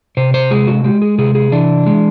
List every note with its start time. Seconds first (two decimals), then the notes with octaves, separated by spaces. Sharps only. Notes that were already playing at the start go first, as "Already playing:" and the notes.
0.17 C3 C5
0.34 C5
0.51 G#3 G#4
0.67 F#4
0.84 G#3 G4
1.02 G#4
1.18 C3 G#4
1.35 G#4
1.52 E3 D4
1.86 G#3